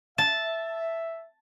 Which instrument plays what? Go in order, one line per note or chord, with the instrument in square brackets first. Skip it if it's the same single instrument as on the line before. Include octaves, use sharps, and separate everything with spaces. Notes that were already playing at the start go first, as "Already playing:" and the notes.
[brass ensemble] E5 [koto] A5